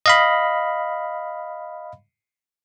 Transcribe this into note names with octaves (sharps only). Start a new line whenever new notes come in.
D#5 F5 B5